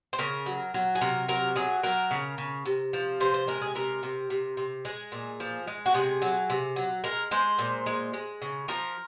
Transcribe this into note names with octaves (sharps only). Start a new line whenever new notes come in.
C5
C#3 A#4
F#3
F#3
G#4
C3 A#4
F#3 A#4
F#3 G#4
F#3 A#4
C#3
C#3
C3
F3
C3 C5
C5
G#3 A#4
G#4
C3 A#4
C3
C3
C3
G#3 G#4
A#2
F3
G#3
F#4
C3 G#4
F#3
C3
F#3
G#3 A#4
G#3 C5
A#2
G#3
G#3
C#3
F3 A#4